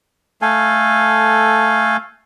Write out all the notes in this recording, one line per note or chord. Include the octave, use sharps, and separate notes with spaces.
A3 A4 F5 G#5